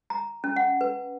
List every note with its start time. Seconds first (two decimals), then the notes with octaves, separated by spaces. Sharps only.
0.10 A#5
0.44 C#4
0.56 F#5
0.81 B4